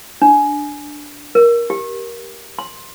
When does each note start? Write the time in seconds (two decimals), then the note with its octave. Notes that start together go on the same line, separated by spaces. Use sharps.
0.22 D4
1.35 A#4
1.70 G4
2.59 C6